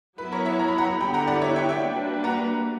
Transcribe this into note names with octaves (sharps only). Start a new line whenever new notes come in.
F#3 B3 E4 B4
A#4 C#5
C#5 E5
A#5
B5
F#5 A#5
D3 G3 B3 E4 G4 G5 B5
F#5 A#5
D5 F#5
C#5 E5
E5 G5
E5 G5
G3 A#3 D4 F#4 B4
F#5 A#5